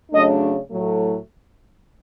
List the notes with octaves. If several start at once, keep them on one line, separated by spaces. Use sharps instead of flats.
C#3 F#3 A3 D4 D#5
A2 F#3 A3